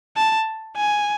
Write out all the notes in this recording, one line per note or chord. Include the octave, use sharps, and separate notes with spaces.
A5
G#5